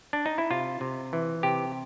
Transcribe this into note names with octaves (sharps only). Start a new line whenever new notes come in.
D4
D#4
E4
C3 F4
C3
E3
C3 G4